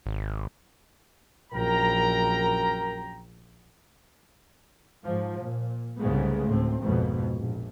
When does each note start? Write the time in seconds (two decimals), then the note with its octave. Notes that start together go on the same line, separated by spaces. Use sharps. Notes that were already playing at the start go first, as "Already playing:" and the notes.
0.06 G#1
1.53 A#1 F#2 A#4 G5 A#5
5.04 G#2 F3
5.40 A#2
5.99 C2 G#2 C#3 G#3 A3 B3
6.48 D2 A2 C4
6.82 A#1 F2 G#2 B2
7.35 A#1